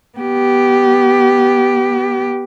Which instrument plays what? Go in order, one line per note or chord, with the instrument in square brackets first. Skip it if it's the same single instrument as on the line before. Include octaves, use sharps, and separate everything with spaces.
[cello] B3 G4